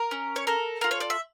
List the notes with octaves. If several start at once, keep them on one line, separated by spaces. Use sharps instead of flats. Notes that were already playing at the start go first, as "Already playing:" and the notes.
Already playing: A#4
C#4
C#5
A4 A#4
F4 A#4
C#5
D5
E5